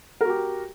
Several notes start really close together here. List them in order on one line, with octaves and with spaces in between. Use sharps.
A#4 F#4 G4